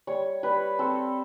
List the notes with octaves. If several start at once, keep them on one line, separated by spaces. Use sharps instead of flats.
G3 C#5
G3 B4
C4 A4